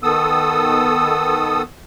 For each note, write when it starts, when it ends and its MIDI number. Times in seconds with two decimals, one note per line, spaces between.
0.03 1.62 51
0.03 1.62 59
0.03 1.62 69
0.03 1.62 87
0.03 1.62 88